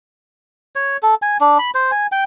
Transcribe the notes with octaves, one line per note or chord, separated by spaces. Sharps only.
C#5
A4
G#5
D4
B5
C5
G#5
G5